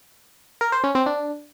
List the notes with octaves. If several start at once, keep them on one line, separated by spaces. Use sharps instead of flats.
A#4
C5
C#4
C4
D4